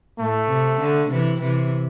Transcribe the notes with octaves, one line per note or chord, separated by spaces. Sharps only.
A2 A3
C3
D3
C3 E3
C3 E3